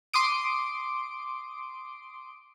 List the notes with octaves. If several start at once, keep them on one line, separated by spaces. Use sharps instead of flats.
C6 D6 D#6 D7